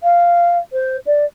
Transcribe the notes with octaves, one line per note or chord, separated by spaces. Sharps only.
F5
C5
D5